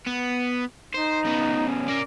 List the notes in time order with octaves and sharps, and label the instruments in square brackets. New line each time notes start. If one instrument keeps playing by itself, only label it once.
[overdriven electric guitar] B3
[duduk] D#4 [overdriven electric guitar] C5
[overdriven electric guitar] C#3 B3
[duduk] C#4
[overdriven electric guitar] A#4 D5